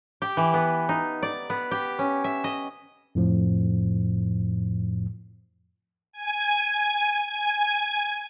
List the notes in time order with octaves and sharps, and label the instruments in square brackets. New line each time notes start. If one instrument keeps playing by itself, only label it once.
[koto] G4
E3
B3
D#4
D5
B3
G4
C#4
E5
D#5
[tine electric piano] F2 A2 F3
[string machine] G#5
G#5